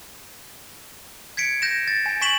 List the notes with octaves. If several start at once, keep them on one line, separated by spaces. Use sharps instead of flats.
G#6 B6 C#7 D7
G6 A#6 E7
A6
G#5
G#5 C#6 B6 E7 F#7 G7